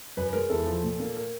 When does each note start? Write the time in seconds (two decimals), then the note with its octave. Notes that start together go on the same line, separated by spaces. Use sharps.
0.17 F#2 B4
0.29 B4
0.33 G#3 A#4
0.49 E2 A4
0.66 F3
0.83 A#2
1.00 A#3
1.16 A#4